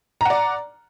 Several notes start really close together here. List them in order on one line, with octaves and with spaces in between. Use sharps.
A#5 F#5 D5